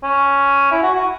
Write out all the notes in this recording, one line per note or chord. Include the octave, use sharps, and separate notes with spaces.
C#4
E4
F#4
F#4